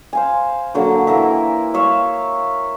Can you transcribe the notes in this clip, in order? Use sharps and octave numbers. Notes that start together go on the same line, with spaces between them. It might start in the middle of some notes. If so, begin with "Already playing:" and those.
C5 F5 G#5
D3 F#3 A#3
E3 A#3 A#4 E5
C#5 E5 F5